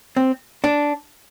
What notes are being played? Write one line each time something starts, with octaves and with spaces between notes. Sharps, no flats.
C4
D4